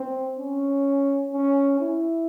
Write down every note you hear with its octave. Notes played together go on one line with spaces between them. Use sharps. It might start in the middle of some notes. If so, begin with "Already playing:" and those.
Already playing: C4
C#4
C#4
E4